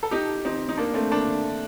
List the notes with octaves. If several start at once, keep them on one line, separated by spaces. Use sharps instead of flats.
A4
D#4 G4
C4 D#4
D#4
A#3 D4
A3 C4
A#3 D4